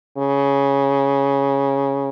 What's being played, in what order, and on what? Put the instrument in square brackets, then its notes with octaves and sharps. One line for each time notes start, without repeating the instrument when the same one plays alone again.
[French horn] C#3